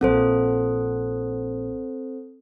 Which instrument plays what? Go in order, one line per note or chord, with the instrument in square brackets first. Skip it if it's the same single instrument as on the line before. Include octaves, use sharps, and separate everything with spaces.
[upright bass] A#1 [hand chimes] C4 A4 C5